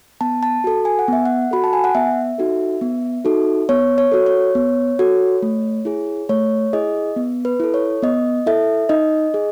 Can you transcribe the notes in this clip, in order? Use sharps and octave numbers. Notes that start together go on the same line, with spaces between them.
B3 A5
A5
F#4 A4
G#5
F#5
B3 E5
F#5
F#4 A4 B5
A5
G#5
F#5
B3 E5
D#4 F#4 A4
B3
D#4 F#4 A4
B3 C#5
C#5
F#4 A4
C#5
B3
F#4 A4
A3
E4 G#4
A3 C#5
E4 G#4 D#5
B3
B4
E4 A4
C#5
B3 D#5
E4 A4 E5
D#4 D#5
G#4